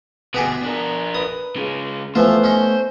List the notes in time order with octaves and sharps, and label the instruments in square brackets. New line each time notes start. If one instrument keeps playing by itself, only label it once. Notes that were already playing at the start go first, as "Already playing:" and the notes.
[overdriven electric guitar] D2 B2 [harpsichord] B3 G4 G#4
[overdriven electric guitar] D4 A#4
[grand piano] B4 [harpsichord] D#6
[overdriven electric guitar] C#3 G#3
[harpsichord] E3 F3 F4 [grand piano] A3 B3 [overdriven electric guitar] C5
[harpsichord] C#4 D#4